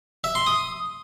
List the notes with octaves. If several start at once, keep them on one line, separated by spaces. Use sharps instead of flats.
E5
C6
D#6